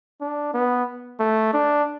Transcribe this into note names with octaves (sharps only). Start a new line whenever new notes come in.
D4
B3
A3
D4